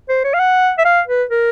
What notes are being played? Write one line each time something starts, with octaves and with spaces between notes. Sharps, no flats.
C5
C#5
F5
F#5
E5
F5
B4
A#4